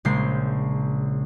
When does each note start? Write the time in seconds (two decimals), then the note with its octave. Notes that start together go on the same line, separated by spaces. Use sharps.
0.05 A#1 C#3 G#3 G6 C7